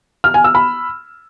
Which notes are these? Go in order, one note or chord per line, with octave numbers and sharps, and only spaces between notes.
F6
G#5
E6
B5